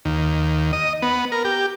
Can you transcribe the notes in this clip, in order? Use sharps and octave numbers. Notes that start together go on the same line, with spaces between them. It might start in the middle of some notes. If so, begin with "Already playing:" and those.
D#2
D#5
B3
A#4
G4